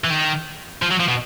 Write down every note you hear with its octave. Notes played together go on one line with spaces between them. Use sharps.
E3
D#3
F3
F#3
F3
B2